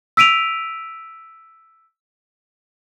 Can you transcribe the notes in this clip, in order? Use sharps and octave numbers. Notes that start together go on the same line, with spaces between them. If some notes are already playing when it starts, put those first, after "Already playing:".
E6 B6 D7 D#7 F7